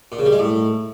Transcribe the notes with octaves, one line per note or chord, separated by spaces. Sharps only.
A#2
C#3
G3
G#3
A2